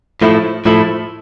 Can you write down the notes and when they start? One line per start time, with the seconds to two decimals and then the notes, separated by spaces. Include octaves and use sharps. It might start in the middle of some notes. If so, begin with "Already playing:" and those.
0.22 A2 F3 A3 E4
0.65 A2 F3 A3 E4